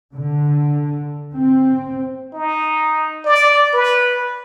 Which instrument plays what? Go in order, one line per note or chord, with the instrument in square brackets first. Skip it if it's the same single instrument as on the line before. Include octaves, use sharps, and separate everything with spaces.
[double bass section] D3
C4
[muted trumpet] D#4
D5
B4